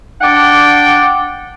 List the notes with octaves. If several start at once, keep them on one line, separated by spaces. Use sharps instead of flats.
D4 D5 F#5 G5